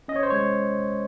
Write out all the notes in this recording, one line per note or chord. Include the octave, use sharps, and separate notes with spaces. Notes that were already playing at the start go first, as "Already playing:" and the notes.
C#4 D#5
C#5
C5
G#3 C#5